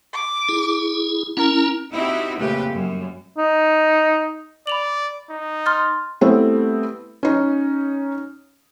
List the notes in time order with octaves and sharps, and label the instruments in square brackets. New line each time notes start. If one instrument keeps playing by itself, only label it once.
[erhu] D6
[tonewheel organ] E4 G#4
[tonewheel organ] C#4 E4 [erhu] A#4
[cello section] C4 D#4 E4 F#4 G4
F2 A#2 C#3 A3 G4 B4
F#2 G3
[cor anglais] D#4
[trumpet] D5 [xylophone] B5 F7 F#7
[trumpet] D#4
[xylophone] C6 F6 A6
[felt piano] G3 A3 B3 C4 E4
C#4 D#4